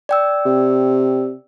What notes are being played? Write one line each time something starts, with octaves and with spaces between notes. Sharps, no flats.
D5 G5 E6
C3